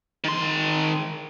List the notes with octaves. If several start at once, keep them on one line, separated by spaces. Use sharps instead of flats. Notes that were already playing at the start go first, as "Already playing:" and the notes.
D#3 C6